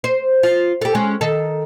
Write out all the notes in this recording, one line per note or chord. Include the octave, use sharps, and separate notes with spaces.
C5
F4
G4 A4
G#3 C#4
D#3 A4